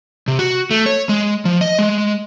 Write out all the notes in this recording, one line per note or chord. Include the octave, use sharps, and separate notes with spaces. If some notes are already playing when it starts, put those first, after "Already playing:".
C3
F#4
A3
C#5
G#3
F3
D#5
G#3